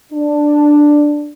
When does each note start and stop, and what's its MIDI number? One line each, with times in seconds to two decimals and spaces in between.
0.12 1.33 62